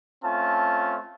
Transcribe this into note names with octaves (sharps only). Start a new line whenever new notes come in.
A3 C4 C#4 F4 A5